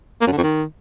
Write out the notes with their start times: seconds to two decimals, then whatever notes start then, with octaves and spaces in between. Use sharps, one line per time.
0.21 A#3
0.27 F#2
0.32 D3
0.38 F2
0.43 D#3